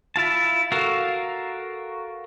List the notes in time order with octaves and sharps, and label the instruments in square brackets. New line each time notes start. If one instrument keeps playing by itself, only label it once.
[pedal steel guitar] E4 F4 A5
F#4 A4 A#4 F5